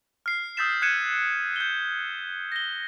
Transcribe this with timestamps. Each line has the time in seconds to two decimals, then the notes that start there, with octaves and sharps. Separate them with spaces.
0.26 F6 C7
0.57 D#6 E6 G6 A6 B6 E7
0.82 F#6 G#6 C#7 D#7 E7
1.56 G6 G7
2.52 A#6 G7